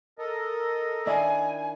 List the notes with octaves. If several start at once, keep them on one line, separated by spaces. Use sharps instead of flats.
A4 A#4 D#5
D#3 D4 E4 G#5